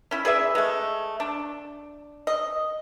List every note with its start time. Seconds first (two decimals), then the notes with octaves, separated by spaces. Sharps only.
0.11 C#4 E4
0.25 G#4 B4 D5 E5
0.55 G#3 A3
1.20 D4
2.27 D#5